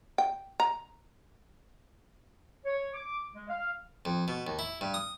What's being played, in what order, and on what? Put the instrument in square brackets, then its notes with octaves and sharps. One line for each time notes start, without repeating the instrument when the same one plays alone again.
[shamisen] G5
A#5
[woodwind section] C#5
D6
G#3
F5
[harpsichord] F2
B2
D#2
E4
G2
D#6